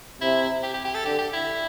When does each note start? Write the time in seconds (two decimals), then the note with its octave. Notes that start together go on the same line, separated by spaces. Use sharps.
0.21 C3 E4
0.63 G4
0.74 G4
0.85 G4
0.94 A4
1.05 D3 G4
1.18 G4
1.33 E4